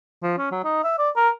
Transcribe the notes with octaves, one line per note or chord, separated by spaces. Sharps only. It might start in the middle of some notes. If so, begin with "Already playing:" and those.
F3
C#4
F#3
D#4
E5
D5
A#4